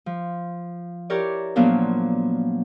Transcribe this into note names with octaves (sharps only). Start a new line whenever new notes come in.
F3
E4 G4 A#4 C#5 D5
A#2 F3 F#3 A#3 B3 D4